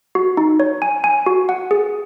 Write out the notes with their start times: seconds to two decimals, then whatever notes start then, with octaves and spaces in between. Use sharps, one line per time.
0.15 F#4
0.37 D#4
0.60 C#5
0.82 G#5
1.04 G#5
1.26 F#4
1.49 F#5
1.71 G#4